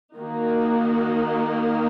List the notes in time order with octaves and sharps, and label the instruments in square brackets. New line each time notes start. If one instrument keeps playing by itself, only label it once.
[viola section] D#3 A#3 D#4 F#4